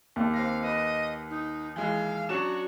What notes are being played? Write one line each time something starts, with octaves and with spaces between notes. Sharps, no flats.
D#2
C4 F5 A#6
B4 D#5
D#4
E3 G#3 F5
F#3 C#4 D4 F#4 E7